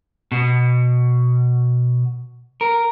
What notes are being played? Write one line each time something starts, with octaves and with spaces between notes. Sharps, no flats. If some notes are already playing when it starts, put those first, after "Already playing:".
B2
A#4